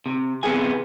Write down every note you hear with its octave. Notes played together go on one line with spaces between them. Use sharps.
C3
C3 B3 G#4 G#5